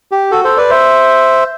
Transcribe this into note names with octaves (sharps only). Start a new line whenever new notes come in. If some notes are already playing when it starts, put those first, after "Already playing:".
G4
F#4 A4
A4 C5
B4 D5
C5 E5